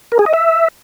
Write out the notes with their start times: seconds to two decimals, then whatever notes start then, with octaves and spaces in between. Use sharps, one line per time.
0.12 A#4
0.19 G#4
0.26 D#5
0.33 E5